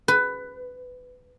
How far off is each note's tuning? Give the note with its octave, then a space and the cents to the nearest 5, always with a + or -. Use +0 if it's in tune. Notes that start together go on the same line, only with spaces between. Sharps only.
B4 +15